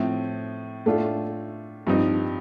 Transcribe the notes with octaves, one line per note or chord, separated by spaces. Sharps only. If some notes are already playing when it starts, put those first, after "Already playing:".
Already playing: A2 F3 C4
A2 A3 D4 F4
G2 F3 C4 D#4